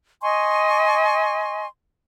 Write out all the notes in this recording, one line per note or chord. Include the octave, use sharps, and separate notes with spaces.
D#5 G#5 C6 C#6